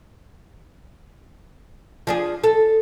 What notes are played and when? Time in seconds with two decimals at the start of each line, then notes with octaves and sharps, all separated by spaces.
2.07 F3 D4 G#4
2.44 A4